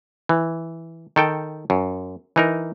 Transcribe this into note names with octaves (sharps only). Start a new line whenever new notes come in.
E3
D#3 A4 G5
F#2
E3 D#4 A#4